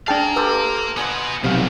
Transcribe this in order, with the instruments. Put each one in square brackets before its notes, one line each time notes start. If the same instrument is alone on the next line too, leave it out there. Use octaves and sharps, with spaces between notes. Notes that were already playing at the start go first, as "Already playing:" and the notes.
[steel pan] D4 G5 A5 [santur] G#4 [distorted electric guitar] F5 A#5
[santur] G4 A4 C5 [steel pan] B4 E6
[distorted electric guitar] B3 F#4 [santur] C5 D#5 G#5
[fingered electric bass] B1 C3 [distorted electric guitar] F3 A3 [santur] F5